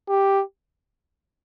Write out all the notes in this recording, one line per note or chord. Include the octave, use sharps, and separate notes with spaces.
G4